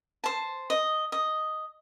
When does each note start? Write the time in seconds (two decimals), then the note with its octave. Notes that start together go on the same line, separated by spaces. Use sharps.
0.24 C5 A5
0.70 D#5
1.12 D#5